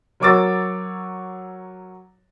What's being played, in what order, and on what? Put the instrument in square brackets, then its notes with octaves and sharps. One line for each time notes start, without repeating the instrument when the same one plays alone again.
[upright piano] F#3 A#4 C#5 D6 E6 A6